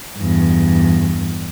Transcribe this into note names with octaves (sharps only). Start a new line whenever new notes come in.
E2 G2